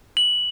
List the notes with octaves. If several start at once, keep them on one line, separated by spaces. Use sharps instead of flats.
F#7